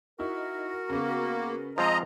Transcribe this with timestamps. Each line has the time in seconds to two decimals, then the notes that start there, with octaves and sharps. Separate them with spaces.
0.19 D#4 E4 F#4 A#4
0.90 C#3 A#3 B3
1.78 F3 G#3 C4 D#5 A#5